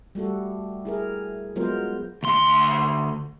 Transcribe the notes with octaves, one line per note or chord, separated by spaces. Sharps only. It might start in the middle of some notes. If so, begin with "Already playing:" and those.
G3 A3 F#4 A4
E4 G#4 A#4
F#3 G#3 B3 F4 A#4 C5
D2 C6